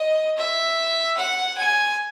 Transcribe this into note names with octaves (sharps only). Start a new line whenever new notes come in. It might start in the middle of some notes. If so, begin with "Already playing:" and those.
Already playing: D#5
E5
F#5
G#5